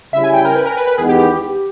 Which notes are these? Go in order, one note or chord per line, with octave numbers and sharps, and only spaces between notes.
C#3 G3 C#4 E4 E5
G#5
G5
A#4
B4
A#4
B4
B4
E2 D#3 G#3 B3 D#4 G#4
G4
G4